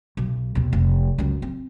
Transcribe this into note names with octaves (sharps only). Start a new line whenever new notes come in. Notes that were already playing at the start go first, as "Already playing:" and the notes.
B1
D#2 B2
F1
C#2 F#2
C4